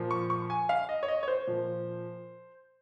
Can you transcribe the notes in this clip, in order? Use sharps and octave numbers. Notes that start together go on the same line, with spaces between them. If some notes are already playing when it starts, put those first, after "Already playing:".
Already playing: A#2 F3
C#6
C#6
G#5
F5
D#5
C#5
D#5
C#5
C5
A#2 F3